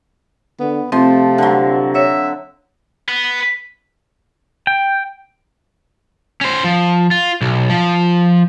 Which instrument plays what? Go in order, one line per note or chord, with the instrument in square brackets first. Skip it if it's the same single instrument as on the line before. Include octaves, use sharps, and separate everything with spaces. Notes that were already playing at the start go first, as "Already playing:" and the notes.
[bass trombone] D3 [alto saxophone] B3
[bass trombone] C3 [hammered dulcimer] F3 [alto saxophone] A3 [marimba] C4
[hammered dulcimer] D3 F#3
[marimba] C#5 [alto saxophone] E5
[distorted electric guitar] B3
[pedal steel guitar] G5
[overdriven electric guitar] C#4 C5
F3
F4
B1
F3